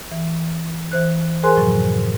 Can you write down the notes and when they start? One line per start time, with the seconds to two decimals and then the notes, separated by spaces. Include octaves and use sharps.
0.12 E3
0.92 E3 C5 F#6
1.43 G#4 A#4 C5 G#5 C6 F#6
1.57 F#2 A2 C3 F3 F#3